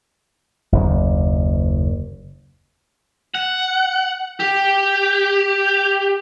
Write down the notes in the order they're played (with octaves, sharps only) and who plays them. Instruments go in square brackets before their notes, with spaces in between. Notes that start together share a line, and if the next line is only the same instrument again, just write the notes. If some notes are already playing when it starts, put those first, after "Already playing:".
[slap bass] F#1 D#2
[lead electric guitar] F#5
G4